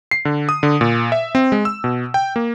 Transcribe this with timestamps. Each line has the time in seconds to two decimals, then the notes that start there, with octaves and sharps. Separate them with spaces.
0.11 C7
0.25 D3
0.49 D#6
0.63 D3
0.81 A#2
1.12 E5
1.35 C4
1.52 G#3
1.65 E6
1.84 B2
2.14 G5
2.36 A#3